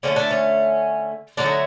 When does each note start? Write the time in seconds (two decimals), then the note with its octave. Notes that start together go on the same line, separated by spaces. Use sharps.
0.03 D3 F#3 A3 C#4
0.16 D4
0.31 C#4
1.37 D3 F#3 A3 D4
1.46 D#4